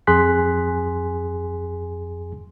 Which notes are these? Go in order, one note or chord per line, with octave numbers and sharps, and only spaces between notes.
F2 G#4 G#5 C6 F#6 B6